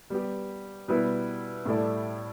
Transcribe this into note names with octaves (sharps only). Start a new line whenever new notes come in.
G3 B3 G4
B2 G3 B3 E4 B4
A2 G3 E4 A4 D5